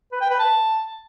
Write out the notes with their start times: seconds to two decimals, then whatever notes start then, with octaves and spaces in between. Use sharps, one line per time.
0.12 B4
0.21 G5
0.30 B4
0.39 A5